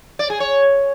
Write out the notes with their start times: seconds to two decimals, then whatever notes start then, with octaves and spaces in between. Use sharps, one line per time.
0.19 D5
0.30 G#4
0.40 C#5